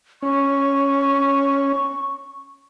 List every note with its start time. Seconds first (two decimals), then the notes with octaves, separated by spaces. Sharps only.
0.22 C#4 C#6